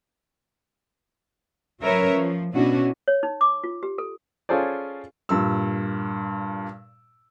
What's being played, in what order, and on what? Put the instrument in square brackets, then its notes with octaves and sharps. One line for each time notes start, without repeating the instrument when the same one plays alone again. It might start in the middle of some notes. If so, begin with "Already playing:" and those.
[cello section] F#3 C#4 A#4 B4 C#5 E5
F3
B2 C#4 D4 E4 F#4
[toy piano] C#5
D#4
D6
F4
G4
A4
[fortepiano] C#4 F4 G#4 A4 C5 D5
[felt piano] G2 A#2 E6